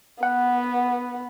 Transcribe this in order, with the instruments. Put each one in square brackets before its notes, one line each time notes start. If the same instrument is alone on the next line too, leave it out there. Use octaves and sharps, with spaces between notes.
[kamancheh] B3 [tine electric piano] F#5